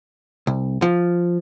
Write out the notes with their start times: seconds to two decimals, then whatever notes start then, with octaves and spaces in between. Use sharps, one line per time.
0.47 C2
0.82 F3